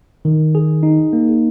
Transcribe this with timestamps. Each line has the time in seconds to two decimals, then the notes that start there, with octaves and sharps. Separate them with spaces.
0.25 D#3
0.55 G#4
0.83 D#4
1.13 A#3